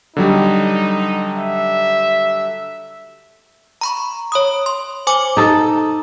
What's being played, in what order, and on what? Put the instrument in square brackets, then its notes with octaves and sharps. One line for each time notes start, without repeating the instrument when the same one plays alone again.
[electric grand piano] D3 F#3 G3 [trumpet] D#4
[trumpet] E5
[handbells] A#5 B5 C#6
C#5 B5 D#6
C6
C5 G#5 D6
[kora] D#4 A4